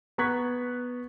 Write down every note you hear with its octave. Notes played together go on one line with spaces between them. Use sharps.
B3 A#5 C#6 F#6 G#6 B6